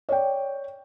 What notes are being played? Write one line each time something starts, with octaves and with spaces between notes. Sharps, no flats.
C#5 D5 G5